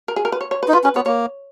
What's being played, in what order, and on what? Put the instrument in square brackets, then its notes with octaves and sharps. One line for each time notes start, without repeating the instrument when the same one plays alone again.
[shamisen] A#4
G#4
A#4
B4
C#5
C#5
B4
[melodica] D#4
[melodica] F4 [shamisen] B4
[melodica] C#4 [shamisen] B4
[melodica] B3 [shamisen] C#5
[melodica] A#3 [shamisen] C#5